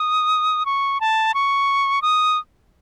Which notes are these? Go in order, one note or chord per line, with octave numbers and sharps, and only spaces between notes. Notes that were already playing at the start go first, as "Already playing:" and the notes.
Already playing: D#6
C#6
A5
C#6
D#6